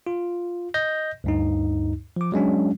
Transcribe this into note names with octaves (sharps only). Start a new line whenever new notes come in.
F4
D#5 G6 A#6
D2 G2 D#4
F3 D6
F#3 G#3 C#4 D4